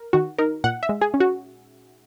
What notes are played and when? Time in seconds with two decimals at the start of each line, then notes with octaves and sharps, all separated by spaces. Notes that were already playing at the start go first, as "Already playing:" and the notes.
Already playing: A#4
0.13 D#3 F#4
0.38 D#4 A#4
0.64 A#2 F#5
0.83 E5
0.89 G#3
1.01 G#4
1.14 C#4
1.20 F#4